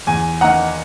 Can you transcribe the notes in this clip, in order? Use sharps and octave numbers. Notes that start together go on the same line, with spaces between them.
E2 G#5
D#3 A#3 D#4 F#5 A#5